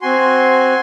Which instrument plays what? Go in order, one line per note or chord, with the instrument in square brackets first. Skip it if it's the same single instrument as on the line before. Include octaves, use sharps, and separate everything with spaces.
[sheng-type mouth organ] C4 F#4 G#5 C6